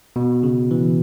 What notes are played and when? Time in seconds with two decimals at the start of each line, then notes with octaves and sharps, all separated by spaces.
0.16 B2
0.43 C#3
0.71 E3